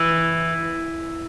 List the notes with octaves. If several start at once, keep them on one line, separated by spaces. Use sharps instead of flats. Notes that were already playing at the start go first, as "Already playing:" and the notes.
Already playing: E3